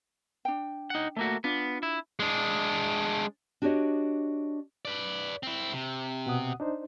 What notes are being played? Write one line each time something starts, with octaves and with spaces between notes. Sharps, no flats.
D4 G5
D#4 F#5
A3 A#3 F#4
B3 D4 F4
E4
G#3 D4
D4 F#4 G4 C5 C#5 D#5
B4 D5
C4 E4
C3
B2 F#5 D#6
D4 D#4 C5